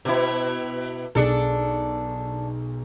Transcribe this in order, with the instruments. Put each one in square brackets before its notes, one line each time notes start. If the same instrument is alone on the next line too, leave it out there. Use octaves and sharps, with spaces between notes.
[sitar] B2 E4 [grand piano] C5
[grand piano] B1 G#4 C#7 [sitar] D4 A4